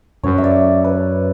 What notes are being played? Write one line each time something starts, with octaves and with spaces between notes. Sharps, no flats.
F#2 C#5
E5
D5
C#5
B4